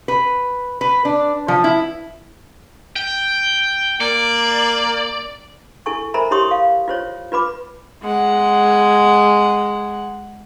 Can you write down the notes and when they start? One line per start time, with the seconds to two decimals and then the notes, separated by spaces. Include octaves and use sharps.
0.08 B4
0.81 B4
1.05 D4
1.48 F3
1.64 E4
2.96 G5
4.01 A#3 D5
5.86 E4 A4 G#5 C#6
6.14 A#4 C5 E5 G#5 A#5 B5
6.31 E4 G4 C#5 C6 C#6 D#6
6.51 F5
6.88 F4 C5 C#5
7.32 F4 B4 B5 D6
8.02 G#3 F#5